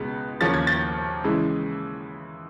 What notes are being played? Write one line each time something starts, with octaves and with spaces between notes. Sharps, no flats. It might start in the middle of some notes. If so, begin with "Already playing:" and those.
Already playing: C#2 B2 G#3 B3
D#2 C#3 F3 A#3 C#4 A6
G#6
G6 A6
C#3 E3 G#3